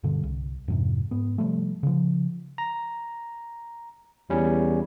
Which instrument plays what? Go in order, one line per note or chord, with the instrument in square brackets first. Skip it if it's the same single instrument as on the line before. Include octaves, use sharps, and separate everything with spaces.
[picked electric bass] G2 B2 D3 G3
C2
F2 G#2 C3
G#2 B3
C3 F3 G3 A3
C#3 F3
[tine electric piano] A#5
[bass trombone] E2 [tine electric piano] G3 C#4